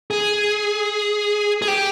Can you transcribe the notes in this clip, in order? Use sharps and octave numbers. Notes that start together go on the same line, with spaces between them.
G#4
G#4
G4